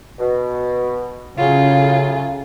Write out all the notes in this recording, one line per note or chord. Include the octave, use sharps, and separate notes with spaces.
B2
A2 C#3 F#3 F4 G#4